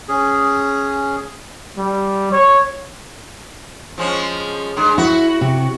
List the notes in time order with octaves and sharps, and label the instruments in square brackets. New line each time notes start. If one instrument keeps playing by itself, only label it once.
[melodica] C#4 G#4
[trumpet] G3
C#5
[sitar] F3 G#3 C#4
D3 G#3
[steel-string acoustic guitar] E4 [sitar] F#4
[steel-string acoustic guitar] C3